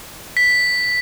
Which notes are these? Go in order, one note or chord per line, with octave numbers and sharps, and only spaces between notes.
B6